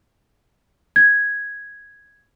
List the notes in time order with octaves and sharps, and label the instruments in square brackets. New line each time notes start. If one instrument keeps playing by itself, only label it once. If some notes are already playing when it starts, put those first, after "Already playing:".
[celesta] G#6